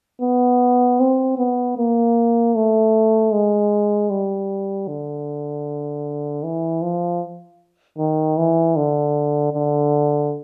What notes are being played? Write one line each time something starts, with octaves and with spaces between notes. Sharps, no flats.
B3
C4
B3
A#3
A3
G#3
G3
D3
E3
F3
D#3
E3
D3
D3